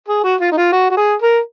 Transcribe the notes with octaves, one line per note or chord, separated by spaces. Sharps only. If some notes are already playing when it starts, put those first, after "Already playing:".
G#4
F#4
F4
D#4
F4
F#4
F#4
G#4
A#4